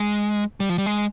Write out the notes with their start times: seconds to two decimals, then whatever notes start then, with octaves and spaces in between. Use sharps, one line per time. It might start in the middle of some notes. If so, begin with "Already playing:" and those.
Already playing: G#3
0.60 G3
0.69 F3
0.78 G3
0.86 G#3